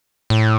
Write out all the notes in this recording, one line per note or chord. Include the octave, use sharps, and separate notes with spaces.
A2